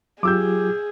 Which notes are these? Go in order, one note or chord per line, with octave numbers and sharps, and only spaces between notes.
F#3 F4 G4 G#4 D6 E6 G6